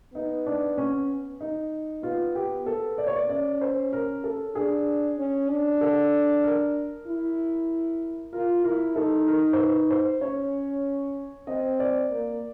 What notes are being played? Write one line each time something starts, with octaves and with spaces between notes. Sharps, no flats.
B3 D#4
D4
C#4
D#4
B3 F4
G4
B3 A4
D5
C#5
D5
C#4 D5
C5
A#4
A4
D4 G#4
C#4
D4
A4
A#4
E4
F4 A#4
E4 A#4
D#4 A4
A#4
C5
B4
C5
C#4 C#5
C4 D#5
D5
A#3